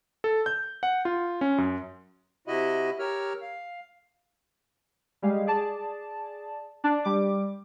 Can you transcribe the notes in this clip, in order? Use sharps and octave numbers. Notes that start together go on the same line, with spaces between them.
A4
G6
F#5
F4
C#4
F#2
C3 E4 F#4 D#5 E5 B5
G4 A#4 C#5 E6 F6
F5
G3 G#3 F5
G#4 D5 A5
D4
G3 D6